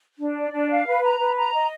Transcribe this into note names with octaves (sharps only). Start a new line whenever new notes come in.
D4
D5
D4
F5
B4
A#5
B4
A#5
D#5